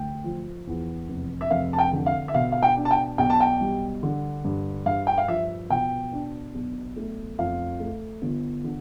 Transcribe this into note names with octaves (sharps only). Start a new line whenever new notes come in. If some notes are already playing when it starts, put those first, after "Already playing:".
Already playing: D2 G5
F3
E2
F1
E5
F1 F5
A5
G5
D3
F5
E5
B2 F5
F5
G5
D4
A5
G5
B1 G5
A5
G5
G3
D3
G2
G2 F5
G5
F5
F3 E5
B2 G5
D4
B1
A3
F2 F5
A3
G1
D3